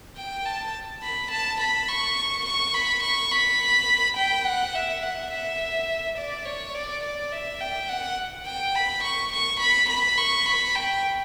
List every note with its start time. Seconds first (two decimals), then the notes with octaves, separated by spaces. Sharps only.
0.17 G5
0.46 A5
1.03 B5
1.31 A5
1.61 B5
1.88 C#6
2.46 C#6
2.74 B5
3.04 C#6
3.31 B5
4.17 G5
4.46 F#5
4.75 E5
5.03 F#5
5.32 E5
6.18 D5
6.46 C#5
6.74 D5
7.03 D5
7.32 E5
7.61 G5
7.89 F#5
8.46 G5
8.75 B5
9.04 C#6
9.32 C#6
9.60 B5
9.90 B5
10.18 C#6
10.46 B5
10.75 G5